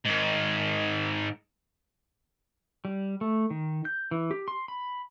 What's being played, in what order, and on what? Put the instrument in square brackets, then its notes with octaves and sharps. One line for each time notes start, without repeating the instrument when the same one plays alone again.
[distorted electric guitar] G#2 D#3
[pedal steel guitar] G3
A3
D#3
G6
E3
G4
C6
B5